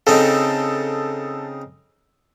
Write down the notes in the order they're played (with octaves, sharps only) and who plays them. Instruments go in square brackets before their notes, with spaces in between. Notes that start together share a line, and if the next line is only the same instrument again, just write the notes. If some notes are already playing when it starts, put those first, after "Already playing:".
[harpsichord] C#3 C4 D#4 [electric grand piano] A4